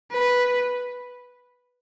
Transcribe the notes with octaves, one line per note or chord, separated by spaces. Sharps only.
B4